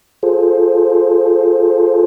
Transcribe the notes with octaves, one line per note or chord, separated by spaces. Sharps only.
F4 G#4 A4 C5